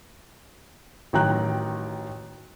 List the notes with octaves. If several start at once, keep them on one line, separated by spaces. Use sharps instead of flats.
A1 D#3 F#3 G5 A#5 F#6